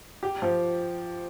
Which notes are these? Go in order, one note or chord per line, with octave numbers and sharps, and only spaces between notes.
G4
F3